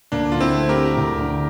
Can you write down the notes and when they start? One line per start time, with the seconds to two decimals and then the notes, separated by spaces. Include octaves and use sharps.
0.12 D2 A#3 D4
0.32 D3 F4
0.41 C4 E4
0.55 A3
0.69 G4 A#4
0.76 E4
0.97 D2
1.19 D3